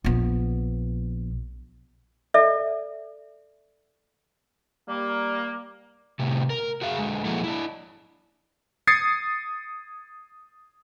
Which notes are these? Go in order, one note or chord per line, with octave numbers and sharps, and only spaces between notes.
A#1 B3
A4 D5 E5
G3 A#3
A2 C3
A#4
F#4 G#4 F5
D3 G#3
F3 A#3 E4 F#4 G#4 A4
D4 E4
D#6 G#6 A6 C7 C#7